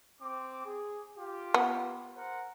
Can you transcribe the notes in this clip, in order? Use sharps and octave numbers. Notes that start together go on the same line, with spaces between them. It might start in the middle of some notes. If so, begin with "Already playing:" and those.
C4 D6
G#4
F4 G4
B3
A#4 C5 F#5